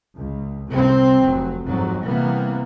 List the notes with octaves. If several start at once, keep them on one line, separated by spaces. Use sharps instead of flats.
C#2
C2 C3 C4
F1 F#3
F2 G#2 F#3
C3 E3 G3 A#3 B3